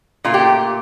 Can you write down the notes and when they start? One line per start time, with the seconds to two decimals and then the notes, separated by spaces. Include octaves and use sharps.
0.24 A#2 A3 F4
0.34 G4